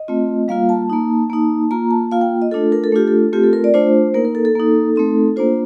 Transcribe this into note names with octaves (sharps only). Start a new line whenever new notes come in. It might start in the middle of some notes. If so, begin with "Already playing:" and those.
Already playing: D#5
A3 C4 F4
G3 A#3 F4 F5
A5
A#3 D#4
A#3 D#4
A#3 F4 A#5
A5
A#3 F4 F5
G5
D#5
A3 D4 F4 A4
A#4
A4
A3 D4 F4 G4
A4
A3 C4 F4 G4
A4
A#4
D5
A3 D4 F4 C5
A#3 D#4 A#4
A#4
A4
A4
A#3 D#4
A3 C4 D#4
A#3 D4 F4 C5